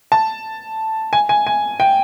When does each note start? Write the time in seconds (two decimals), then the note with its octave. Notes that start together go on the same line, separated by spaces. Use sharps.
0.12 A5
1.13 G#5
1.29 G#5
1.47 G#5
1.80 G5